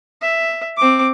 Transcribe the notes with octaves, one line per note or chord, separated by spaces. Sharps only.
E5
C4 D6